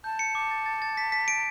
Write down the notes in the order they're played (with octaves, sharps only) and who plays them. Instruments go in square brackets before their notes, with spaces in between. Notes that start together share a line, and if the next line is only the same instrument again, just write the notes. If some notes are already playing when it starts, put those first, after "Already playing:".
[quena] A5 [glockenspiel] G6
[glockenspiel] C#7
D6
A6
A6
A6
B6
B6
D7